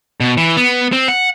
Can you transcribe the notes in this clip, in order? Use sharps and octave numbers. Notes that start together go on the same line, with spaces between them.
B2
E3
B3
C4
F#5